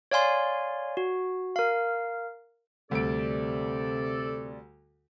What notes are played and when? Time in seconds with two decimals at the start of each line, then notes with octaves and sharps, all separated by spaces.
0.11 C#5 D5 F5 G#5 C6
0.97 F#4
1.56 A#4 F5
2.91 D2 C3 G3 A4 D5 D7